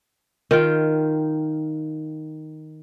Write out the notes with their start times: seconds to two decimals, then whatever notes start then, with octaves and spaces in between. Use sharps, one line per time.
0.51 D#3 F4 G5